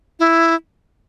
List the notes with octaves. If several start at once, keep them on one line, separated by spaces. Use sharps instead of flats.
E4